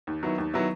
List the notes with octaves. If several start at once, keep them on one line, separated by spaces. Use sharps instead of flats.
D#2
D#3 F#3 B3 E4
D#2
D#3 F#3 B3 E4